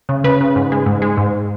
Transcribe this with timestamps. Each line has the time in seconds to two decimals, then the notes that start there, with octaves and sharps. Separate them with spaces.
0.09 C#3
0.24 C#3 B4
0.41 C#3
0.56 G#2
0.72 G#3
0.86 G#2
1.02 G#3
1.17 G#2